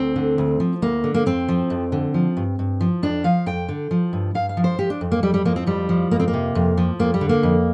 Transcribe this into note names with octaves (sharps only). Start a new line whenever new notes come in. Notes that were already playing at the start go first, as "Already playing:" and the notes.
Already playing: D2 C4
D3
D2
F3
D2 A#3
D3
A#3
F2 C4
F3
F2
D3
F3
G2
G2
F3
F2 D4
F3 F5
F2 G5
D3
F3
G2
G2 F5
F5
F3
C5
F3 G4
D4
F2
A#3
F2 G3
G3
F3 A#3
C4
F2 G3
F3
F2 A#3
C4
A#3
C3
F2
F3
F2 A#3
G3
D3
A#3
F2